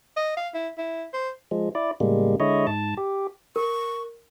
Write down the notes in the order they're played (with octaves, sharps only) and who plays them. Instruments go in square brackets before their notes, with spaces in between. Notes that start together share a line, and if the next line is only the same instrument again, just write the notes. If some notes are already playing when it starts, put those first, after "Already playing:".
[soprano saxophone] D#5
F5
E4
E4
C5
[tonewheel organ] F3 G#3
E4 D5
A2 C#3 G3 G#3 A#3
D3 G#3 E4 C#5 D#5
G#2 A5
G4
[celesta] A#4 [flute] C#6